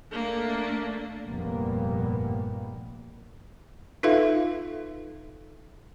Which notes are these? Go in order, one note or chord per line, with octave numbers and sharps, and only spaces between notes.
A3 A#3 D4
F1 G2 A#2 G3 A#3 B3
D#4 F4 A4 B4 E5 F5